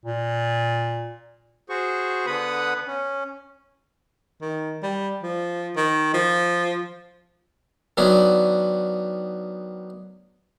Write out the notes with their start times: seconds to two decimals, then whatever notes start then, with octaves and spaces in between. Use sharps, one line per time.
0.06 A#2
1.69 F#4 G#4 C5 C#6
2.26 D3 B3 B4 F#5 B5 D#6
2.87 C#4
4.42 D#3
4.83 G3
5.23 F3
5.76 D#3
6.14 F3
7.97 D#3 F#3 B3 D4